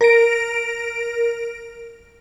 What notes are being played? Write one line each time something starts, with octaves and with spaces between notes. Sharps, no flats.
A#4 A#6 D7